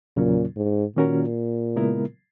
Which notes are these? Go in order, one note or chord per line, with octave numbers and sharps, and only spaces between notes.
E2 A#2 C#3 F#3 C#4
G#2
A#2 D#3 A#3 C#4 F#4 A#4
C#3 G#3 B3 E4 A#4